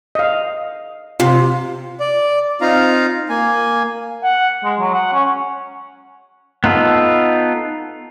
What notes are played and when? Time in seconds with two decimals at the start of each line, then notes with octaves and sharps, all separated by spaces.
0.15 D#5 F5
1.20 C3 F4
2.00 D5
2.61 C4 D#4 F4 F5 A#5
3.29 A#3 G#5
4.24 F#5
4.64 G#3
4.80 F#3
4.94 F#5
5.13 C#4
6.64 B3 D#4 F4 A4